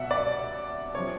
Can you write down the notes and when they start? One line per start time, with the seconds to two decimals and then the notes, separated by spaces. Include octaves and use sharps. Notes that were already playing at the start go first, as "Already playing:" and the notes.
Already playing: C2 B2 E5 F#5
0.11 D5
0.95 C3 F3 C#5